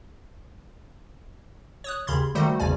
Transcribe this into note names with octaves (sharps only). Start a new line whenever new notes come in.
C#5 D#6 F#6
D#2 C#3 B5 C6 G#6
D#3 G3 A3 F#4 C5
G#1 E2 C#3 D5 G#5